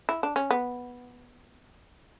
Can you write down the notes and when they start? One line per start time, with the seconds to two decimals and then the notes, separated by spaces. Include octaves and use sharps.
0.09 E4
0.23 D4
0.36 C#4
0.51 B3